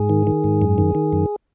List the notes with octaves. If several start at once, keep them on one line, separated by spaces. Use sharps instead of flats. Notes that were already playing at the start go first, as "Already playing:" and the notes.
Already playing: G#2 G#4
D#3
D#3
G#2
F#2
D#3
D#3
F#2